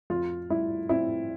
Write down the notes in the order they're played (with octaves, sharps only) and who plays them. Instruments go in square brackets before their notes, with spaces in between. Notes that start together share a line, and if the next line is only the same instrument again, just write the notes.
[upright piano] F2 F4
G3 E4
C4 E4